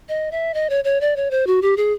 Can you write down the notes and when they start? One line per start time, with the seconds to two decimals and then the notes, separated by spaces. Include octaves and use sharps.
0.09 D#5
0.31 E5
0.54 D#5
0.70 C#5
0.84 C#5
1.01 D5
1.16 C#5
1.31 C5
1.47 F#4
1.62 G4
1.77 G#4